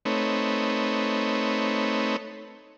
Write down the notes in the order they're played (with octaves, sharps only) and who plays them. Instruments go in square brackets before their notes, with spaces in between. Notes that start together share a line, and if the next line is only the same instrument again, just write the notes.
[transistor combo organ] A3 C4 D#4 B4 C#5